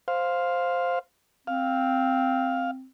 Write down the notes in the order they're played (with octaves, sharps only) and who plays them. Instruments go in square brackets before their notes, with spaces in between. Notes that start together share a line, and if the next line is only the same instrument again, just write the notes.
[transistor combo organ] C5 F5
[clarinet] C4 [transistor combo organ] F5